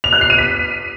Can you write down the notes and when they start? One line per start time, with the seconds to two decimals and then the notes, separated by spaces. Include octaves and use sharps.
0.04 F7
0.13 F#6
0.21 C7
0.30 D#7
0.39 B6